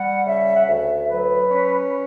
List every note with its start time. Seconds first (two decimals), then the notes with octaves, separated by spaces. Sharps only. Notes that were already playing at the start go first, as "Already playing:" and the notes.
Already playing: G3 F#5
0.26 C#3 E5
0.56 F#5
0.67 D2 E5
1.10 F#3 B4
1.51 C#4